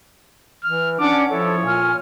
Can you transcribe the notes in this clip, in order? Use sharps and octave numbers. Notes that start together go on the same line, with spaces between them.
E3 F6
C#4 D4 D5 F#5 D6
F3 E4 A4 C#5
A#2 G#5 F6